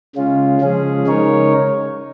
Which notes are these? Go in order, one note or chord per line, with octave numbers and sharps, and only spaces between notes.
C#3 G#3 C#4 F4
C#3 F3 G#3 C#4 G#4
C#3 G#3 D#4 A#4 C#5